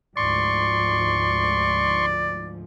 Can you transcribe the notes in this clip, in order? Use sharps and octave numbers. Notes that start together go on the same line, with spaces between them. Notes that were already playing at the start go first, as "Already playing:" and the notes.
D2 G#2 F3 D5 C6 C#6